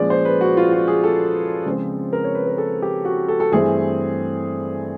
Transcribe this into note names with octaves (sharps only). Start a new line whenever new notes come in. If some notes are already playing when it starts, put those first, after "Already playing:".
Already playing: A#2 F3 G#3 C#4 D5
C5
B4
F#4
F4
F#4
G#4
A4
C#3 F3 G#3 C4
A#4
C#5
B4
A#4
A4
G4
F#4
A4
A4
G2 E3 A3 C4 G#4